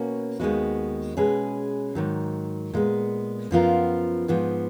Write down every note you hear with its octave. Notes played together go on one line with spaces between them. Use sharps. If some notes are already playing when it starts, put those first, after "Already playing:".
Already playing: B2 A#3 C#4 F#4
D#2 D#3 G#3 B3 F#4
B2 G#3 C#4 G#4 B4
G#2 D#3 F#3
A#2 G#3 B3
F#2 F3 B3 F4 A#4
G#2 F3 B3